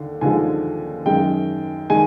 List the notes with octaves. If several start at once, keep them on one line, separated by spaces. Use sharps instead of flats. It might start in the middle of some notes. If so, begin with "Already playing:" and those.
Already playing: D#2 D3
D#2 D3 F3 G#3 G#5
F#2 D#3 G#3 G5
D#3 G#3 G#5